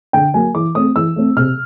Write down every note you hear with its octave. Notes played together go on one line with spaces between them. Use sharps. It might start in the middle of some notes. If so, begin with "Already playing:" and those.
D3 G5
F#3 A#3 G#5
E3 D6
A3 C4 D#6
E3 E6
A3 C4
C3 F6